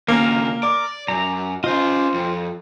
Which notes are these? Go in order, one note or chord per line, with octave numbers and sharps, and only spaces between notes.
D#2 C#3 A#3 A#4
D5 D6
F#2 A#5
C#4 F4 C5 D#5
F2